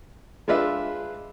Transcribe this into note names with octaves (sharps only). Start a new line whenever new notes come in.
G#3 D4 F4 B4 E5